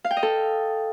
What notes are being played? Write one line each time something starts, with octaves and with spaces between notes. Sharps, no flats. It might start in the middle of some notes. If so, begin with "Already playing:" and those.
F5
G5
D#5
A4